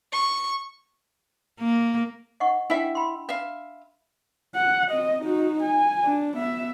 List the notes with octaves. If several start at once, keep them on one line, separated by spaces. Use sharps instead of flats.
C#6
A#3
D#5 F#5 C#6
D4 E4 E5 G5
B5 C6
E5 F5
F#5
C4 D#5
D#4 F#4
G#5
D4
B3 E5